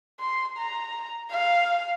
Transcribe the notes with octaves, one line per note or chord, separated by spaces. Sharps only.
C6
A#5
F5